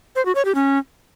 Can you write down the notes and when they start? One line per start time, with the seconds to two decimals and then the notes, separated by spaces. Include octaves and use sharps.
0.16 C5
0.25 F#4
0.35 C#5
0.45 G4
0.55 C#4